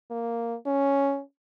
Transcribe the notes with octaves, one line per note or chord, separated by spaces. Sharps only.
A#3
C#4